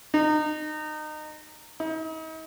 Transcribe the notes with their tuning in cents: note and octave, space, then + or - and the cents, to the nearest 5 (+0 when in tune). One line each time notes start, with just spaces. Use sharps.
D#4 -25
D#4 +40